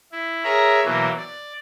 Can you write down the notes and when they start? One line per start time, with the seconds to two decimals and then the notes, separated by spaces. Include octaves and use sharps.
0.12 E4
0.44 G#4 A#4 C#5 E5 A#5
0.85 B2 E3 F#3 A#3
1.17 D5